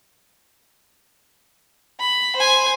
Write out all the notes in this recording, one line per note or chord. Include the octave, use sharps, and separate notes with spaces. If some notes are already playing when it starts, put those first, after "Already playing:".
B5
C5 G#5